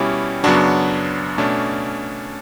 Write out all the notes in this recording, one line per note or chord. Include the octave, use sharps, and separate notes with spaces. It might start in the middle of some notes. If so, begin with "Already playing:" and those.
Already playing: B2 G3 C#4 E4 G4
F#2 C#3 F#3 B3 D4 F#4
B2 A3 C#4 D4